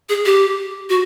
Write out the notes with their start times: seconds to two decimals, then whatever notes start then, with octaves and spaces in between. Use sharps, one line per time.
0.09 G#4
0.25 G4
0.89 F#4